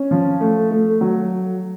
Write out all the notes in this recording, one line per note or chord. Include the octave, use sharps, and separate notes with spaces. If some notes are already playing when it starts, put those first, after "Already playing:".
Already playing: C#4
F3
A3
A3
F#3